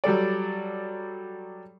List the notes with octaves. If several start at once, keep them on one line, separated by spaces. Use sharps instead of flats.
F#3 G3 A4 D5